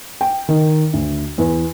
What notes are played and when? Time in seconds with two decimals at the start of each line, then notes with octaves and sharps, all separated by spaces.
0.21 G5
0.49 D#3
0.93 D2
1.38 E2